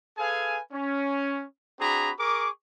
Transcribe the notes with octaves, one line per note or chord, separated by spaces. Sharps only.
G#4 A4 B4 F5 G#5
C#4
C4 D4 F#4 G#4 A#5 B5
G#4 A#4 C#6 D6